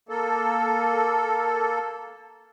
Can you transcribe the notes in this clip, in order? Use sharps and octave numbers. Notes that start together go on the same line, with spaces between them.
A#3 A4